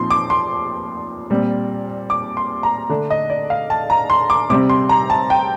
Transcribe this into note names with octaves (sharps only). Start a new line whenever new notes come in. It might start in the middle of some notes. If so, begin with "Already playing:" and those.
Already playing: A#2 F3 C4 D#4 C6
D6
C6
A#2 G3 C4
D6
C6
A#5
D3 A3 D4
D#5
D5
F5
A5
A#5
C6
D6
C3 G3 C4 D6
C6
A#5
A5
G5